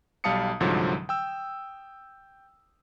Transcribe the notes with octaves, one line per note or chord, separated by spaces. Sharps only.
B1 G3 F5 A5 D#6 C#7
C2 G#2 D3 F3 F#3
G5 E6